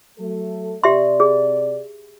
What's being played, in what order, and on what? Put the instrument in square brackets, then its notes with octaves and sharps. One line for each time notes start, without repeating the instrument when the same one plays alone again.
[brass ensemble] F#3 A3 A4
[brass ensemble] C3 D5 [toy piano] G4 E5 C6
[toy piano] G#4